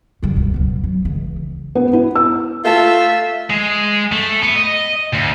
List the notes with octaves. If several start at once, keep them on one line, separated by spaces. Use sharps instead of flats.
C#3 G3
C#2 B2
F#2 B2
F#3
C#2 E3
B3
E4
E6
A3 F4 A4 E5
G#3
A3
B3
D#5
D2